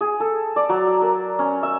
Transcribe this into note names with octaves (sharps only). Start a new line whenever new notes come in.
G#4
A4
D5
F#3
A#4
C#4
E5